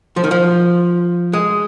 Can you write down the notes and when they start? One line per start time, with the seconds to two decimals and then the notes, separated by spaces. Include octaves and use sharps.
0.16 F3
0.24 D#3
0.31 F3
1.33 G#3